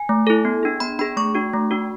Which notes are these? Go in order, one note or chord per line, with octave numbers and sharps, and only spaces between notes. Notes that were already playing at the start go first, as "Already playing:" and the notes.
Already playing: G#5
A3
E4 A4
B3
D4 G#4
B3 B5
D4 G#4 B5
A3 C#6
D4 F#4
A3
D4 F#4